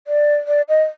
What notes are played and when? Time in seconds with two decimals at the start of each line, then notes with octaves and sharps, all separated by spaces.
0.07 D5
0.47 D5
0.69 D#5